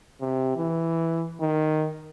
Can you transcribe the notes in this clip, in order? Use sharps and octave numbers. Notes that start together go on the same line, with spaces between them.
C3
E3
D#3